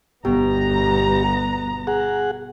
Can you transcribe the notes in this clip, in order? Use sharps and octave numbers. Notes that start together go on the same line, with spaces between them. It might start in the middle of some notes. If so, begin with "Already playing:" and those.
G1 B2 B3 G4 A#5
G#4 F#5